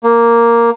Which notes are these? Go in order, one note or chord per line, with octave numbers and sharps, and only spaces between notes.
A#3